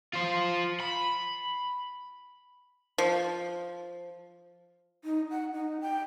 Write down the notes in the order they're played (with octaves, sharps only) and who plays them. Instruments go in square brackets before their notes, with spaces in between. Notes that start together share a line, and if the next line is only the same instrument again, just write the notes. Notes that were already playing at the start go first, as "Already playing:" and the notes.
[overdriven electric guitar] F4 C5
B5
[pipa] F3
[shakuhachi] D#4
F#5
D#4
G5